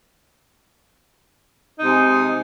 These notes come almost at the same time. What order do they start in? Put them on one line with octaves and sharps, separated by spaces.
D#4 C3 G#3